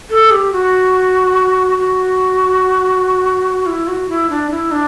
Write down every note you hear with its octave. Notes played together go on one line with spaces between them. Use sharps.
A4
G4
F#4
F#4
E4
F#4
E4
D4
E4
D4